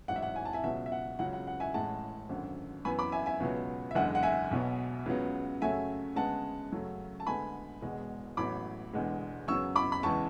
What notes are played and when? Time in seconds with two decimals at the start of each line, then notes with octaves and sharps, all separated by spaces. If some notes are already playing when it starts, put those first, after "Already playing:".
0.08 A1 G#2 F#3 F#5
0.16 E5
0.23 F#5
0.36 G#5
0.45 A5
0.53 E5 G#5
0.63 C#2 B2 F#3 B3 E5
0.86 E5
0.92 F#5
1.19 C#2 C#3 F#3 F#5
1.33 F#5
1.47 F#5
1.60 E5 G#5
1.74 A1 A2 G#3 F#5 A5
2.29 G#1 F#2 D3
2.85 F#2 E3 B3 G#5 B5
2.99 B5 D6
3.12 E5 G#5
3.26 E5 G#5
3.40 C#2 B2 F#3 B3
3.91 E5
3.95 F#1 E2 D3 G#3 F#5
4.15 F#5
4.23 E5 G#5
4.51 B1 B2 F#3 B3
5.06 C#2 C#3 F#3 B3
5.61 F#2 C#3 F#3 A3 E5 G#5
6.16 D2 C#3 G#3 B3 F#5 A5
6.72 F#2 C#3 F#3 A3
7.20 A5
7.27 D2 D3 G#3 B3 G#5 B5
7.82 E1 E2 B2 G#3
8.37 A1 A2 F#3 B3 B5 D6
8.93 E1 E2 D3 G#3 B3
9.48 F#2 C#3 F#3 B3 C#6 E6
9.76 B5 D6
9.92 B5
10.03 E2 C#3 E3 G#3 A5 C#6